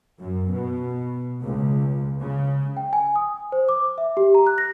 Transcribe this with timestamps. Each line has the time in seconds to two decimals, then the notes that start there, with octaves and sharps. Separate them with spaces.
0.19 F#2
0.51 B2
1.43 C#2
2.23 C#3
2.77 G5
2.93 G#5
3.16 D#6
3.52 C5
3.69 D6
3.98 E5
4.17 G4
4.34 A#5
4.47 F#6
4.58 A#6